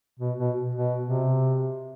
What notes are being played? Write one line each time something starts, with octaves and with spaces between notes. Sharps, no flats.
B2
B2
B2
C3